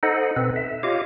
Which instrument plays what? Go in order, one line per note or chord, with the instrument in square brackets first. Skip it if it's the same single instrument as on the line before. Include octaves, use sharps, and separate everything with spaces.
[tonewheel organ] D#4 A4 C5 D#5 F#5
B2 C4 A4 B4
E5
F4 G4 C#5 D#5 F5 D6